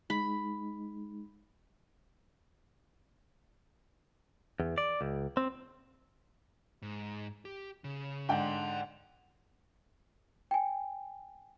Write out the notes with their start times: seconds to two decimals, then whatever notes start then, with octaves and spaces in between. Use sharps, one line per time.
0.10 G#3 D#4 B5
4.60 E2
4.78 D5
5.01 C#2
5.37 C4
6.82 G#2
7.45 G4
7.84 C#3
8.29 G#2 D3 G5 A5 C6
10.51 G5 G#5